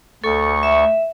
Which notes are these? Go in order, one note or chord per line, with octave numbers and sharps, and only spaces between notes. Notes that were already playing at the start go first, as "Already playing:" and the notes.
D2 A4 C#6
E5